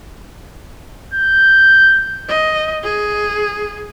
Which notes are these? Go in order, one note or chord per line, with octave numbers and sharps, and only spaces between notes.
G6
D#5
G#4